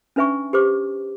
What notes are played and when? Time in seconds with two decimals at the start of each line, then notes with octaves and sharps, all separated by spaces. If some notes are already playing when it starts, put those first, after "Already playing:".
0.16 C#4 D4 B4 E5 G#5 C#6
0.53 G4 B4 C5 D6